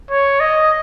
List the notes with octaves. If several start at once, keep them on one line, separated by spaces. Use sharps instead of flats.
C#5
D#5